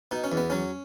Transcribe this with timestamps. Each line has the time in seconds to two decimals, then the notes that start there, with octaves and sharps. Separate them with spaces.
0.11 B2 D#4
0.24 C#4
0.32 E2
0.37 B3
0.50 F#3 C#4